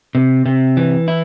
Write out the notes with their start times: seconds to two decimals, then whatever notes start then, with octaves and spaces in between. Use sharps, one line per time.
0.15 C3
0.46 C3
0.77 E3
1.08 E4